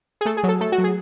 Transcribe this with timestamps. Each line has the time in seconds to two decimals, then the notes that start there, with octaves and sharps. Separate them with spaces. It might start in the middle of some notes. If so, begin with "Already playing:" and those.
0.21 G#4
0.25 A3 A4
0.37 G#4
0.43 F#3
0.48 A4
0.61 A3 A4
0.72 F#4
0.78 F#3
0.84 G#4